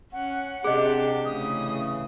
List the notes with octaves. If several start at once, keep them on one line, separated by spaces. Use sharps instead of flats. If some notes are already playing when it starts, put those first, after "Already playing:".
C#4 F#5
C3 D4 G4 G#4 D#5
A2 C#3 E3 D#6